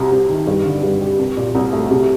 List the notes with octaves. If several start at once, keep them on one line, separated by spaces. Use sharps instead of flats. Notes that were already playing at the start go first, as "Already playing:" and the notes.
Already playing: C2 C3
C2
D#3
G2
D3
G2
G3
C2
A#2
C2
A3
C3